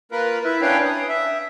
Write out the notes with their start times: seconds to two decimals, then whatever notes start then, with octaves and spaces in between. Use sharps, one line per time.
0.12 A#3 F4 A#4 B4
0.44 E4 B4 E5
0.61 C#4 D4 B4 C#5 F5 G5
0.85 D#6
1.09 E5